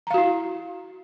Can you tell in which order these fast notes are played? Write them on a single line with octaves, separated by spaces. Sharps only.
A#5 F5 F#4 E4